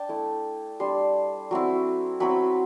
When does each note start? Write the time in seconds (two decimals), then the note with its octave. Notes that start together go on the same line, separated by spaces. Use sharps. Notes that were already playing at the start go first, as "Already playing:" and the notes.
Already playing: D4 G5 A5
0.09 A3 E4
0.80 G3 D4 C6
1.51 F#3 C4 E4
2.20 F#3 C4 E4 B5